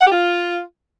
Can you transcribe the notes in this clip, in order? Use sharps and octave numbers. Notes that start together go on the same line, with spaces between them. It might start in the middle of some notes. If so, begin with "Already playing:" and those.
F#5
G4
F4